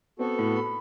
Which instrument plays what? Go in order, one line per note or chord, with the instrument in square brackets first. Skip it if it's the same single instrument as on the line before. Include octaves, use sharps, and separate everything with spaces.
[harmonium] B3 F#4 A4 [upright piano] C4
[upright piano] A2
B5